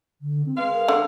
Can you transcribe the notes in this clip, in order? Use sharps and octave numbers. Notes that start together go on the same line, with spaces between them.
D3
C4
G#3 B4 F5
A#4
D3